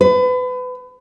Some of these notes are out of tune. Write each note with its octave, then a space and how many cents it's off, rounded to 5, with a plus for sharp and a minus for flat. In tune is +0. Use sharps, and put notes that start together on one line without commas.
B4 +30